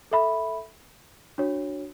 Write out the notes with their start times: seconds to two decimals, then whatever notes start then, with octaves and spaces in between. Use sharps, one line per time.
0.11 A4 E5 B5
1.38 D4 F#4 C#5